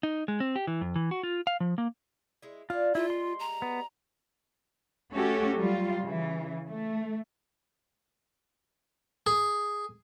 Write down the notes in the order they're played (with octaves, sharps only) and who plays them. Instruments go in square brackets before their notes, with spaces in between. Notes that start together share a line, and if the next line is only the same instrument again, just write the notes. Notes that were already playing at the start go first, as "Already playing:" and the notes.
[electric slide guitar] D#4
G#3
C4
G4
E3
F2
E3
F#4
F4
F5
F3
A#3
[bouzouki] G#3 E4
[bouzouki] D4 E4 [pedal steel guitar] F4
[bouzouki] G3 G#3 A#3 [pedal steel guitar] E4 [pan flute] F4
[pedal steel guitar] C6
[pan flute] A#5
[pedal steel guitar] B3
[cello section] A3 C#4 F#4 G4 A4
F#3 G3 F4
C#3 E3
A3
[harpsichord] G#4